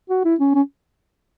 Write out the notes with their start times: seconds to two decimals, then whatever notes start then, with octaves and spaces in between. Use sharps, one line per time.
0.10 F#4
0.25 E4
0.40 C#4
0.55 C#4